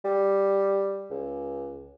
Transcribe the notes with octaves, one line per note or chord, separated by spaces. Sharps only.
G3
C#2